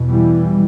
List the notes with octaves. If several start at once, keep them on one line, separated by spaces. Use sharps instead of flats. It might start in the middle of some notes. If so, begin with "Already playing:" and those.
Already playing: E2 B2
E3 G3